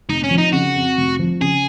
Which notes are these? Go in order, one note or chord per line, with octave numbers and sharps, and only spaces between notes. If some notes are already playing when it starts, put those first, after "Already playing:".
F1 D#4
C#4
F3
D#4
C#3 F#4
F2
F1
F3
C#3 G#4